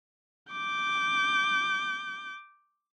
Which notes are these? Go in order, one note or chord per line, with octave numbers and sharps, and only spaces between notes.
D6 G6